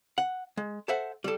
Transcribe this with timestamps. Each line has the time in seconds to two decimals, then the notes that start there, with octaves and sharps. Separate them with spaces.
0.18 F#5
0.57 G#3
0.88 A4 C5 E5 F#5
1.24 G3 A4